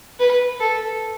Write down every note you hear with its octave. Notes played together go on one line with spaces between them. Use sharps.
B4
A4